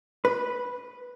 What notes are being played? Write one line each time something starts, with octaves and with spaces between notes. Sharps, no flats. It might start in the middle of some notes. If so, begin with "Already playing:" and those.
B4